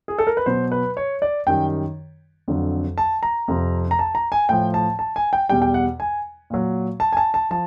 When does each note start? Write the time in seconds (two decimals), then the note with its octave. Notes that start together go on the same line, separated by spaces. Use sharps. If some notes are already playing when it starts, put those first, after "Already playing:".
0.08 G#4
0.19 A4
0.27 A#4
0.37 B4
0.46 B2 F#3 C5
0.72 B4
0.97 C#5
1.22 D5
1.47 F#2 D#3 G3 G5
2.48 F2 D3 F#3
2.98 A5
3.23 A#5
3.48 F2 C3 F3
3.91 A#5
3.99 A5
4.15 A#5
4.32 G#5
4.49 A2 F3 G5
4.74 A5
4.99 A5
5.16 G#5
5.33 G5
5.49 E2 B2 G3 G5
5.62 G5
5.74 F#5
6.00 G#5
6.50 A#2 F#3
7.00 A5
7.13 G#5
7.17 A5
7.34 A5
7.51 F3 A5